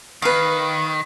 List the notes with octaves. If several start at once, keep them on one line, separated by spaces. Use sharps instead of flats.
D#3 B4 F5